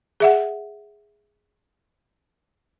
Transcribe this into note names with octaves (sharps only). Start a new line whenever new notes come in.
G#4 E5 F#5